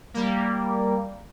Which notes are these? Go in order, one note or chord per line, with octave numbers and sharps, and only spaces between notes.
G3 A#3